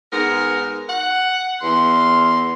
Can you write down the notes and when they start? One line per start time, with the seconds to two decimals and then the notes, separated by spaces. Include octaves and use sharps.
0.11 G#2 B3 A#4
0.89 F#5
1.62 E2 C6